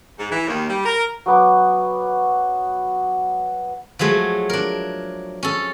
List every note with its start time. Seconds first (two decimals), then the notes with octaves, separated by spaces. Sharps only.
0.19 G#2
0.30 E3
0.47 D#2
0.69 G3
0.85 A#4
1.26 F#3 B3 D6
3.99 F3 F#3 G#3 A3
4.50 D4 A#4
5.43 C#4 A4